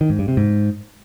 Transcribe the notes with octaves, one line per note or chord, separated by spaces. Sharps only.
D#3
G#2
G2
C3
G#2